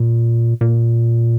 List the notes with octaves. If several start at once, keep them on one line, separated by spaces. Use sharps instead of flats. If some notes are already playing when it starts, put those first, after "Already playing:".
Already playing: A#2
A#2